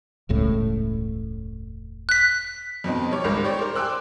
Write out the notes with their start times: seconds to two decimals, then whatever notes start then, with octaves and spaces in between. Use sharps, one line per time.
0.29 E1 C#2 A2
2.09 F#6 B6
2.84 F2 B2 C4 D#4
3.11 G3 C#5 D6
3.24 G#1 C#2 G#2 A#4
3.44 G4 C#5 D5
3.59 A#4 C5
3.76 G5 G#5 C6 D6 E6 F#6